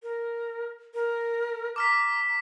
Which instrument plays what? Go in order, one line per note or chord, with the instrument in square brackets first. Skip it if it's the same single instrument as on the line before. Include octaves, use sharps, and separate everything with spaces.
[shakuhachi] A#4
A#4
[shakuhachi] A#5 [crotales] D6 F6 B6